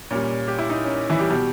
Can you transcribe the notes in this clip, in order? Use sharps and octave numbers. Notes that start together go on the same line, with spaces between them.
A#2 G3 C#4
G4
E4
D#4
C#4
E3 E4
G3 G4
B2 G3 G4